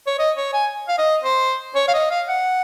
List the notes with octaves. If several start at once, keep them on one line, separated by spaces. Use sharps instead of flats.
C#5
D#5
C#5
G#5
F5
D#5
C5
C#5
F5
D#5
F5
F#5